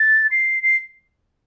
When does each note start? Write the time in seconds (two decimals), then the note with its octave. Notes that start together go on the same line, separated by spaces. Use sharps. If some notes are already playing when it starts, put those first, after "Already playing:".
Already playing: A6
0.31 C7
0.63 C7